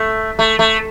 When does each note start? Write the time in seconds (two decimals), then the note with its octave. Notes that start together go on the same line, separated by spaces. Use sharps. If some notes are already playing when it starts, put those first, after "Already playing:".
Already playing: A3
0.39 A3
0.59 A3